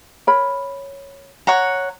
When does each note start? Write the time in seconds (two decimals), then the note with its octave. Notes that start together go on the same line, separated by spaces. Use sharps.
0.27 A#4 C#5 B5
1.47 C#5 F#5 A#5